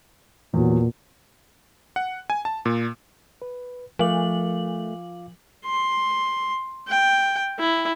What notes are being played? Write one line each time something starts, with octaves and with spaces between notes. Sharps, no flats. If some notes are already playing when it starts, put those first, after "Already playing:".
E2 A#2 F#3
F#5
G#5
A5
A#2
B4
F3 A3 F4 F5 D6 F#7
C6
G5
E4